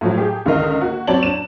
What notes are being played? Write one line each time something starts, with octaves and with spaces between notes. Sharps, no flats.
A2 F3 F#3
G4 G#4
C#2 D3 D#3 A#4 D#5 F5
A#3 F#4
F#3 C4 C#5 D5 A5 F#7
D4 E7